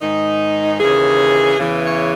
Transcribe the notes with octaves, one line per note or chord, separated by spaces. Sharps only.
G#2 D#3 D#4
D#2 C#3 E3 G#4
E2 C#3 E3
C#5